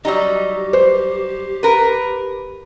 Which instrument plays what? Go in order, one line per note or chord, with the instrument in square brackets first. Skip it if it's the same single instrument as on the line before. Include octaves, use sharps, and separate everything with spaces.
[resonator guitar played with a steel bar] F#3 G3 D#4 [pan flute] G4
[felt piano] C5
[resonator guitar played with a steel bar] A#4 B4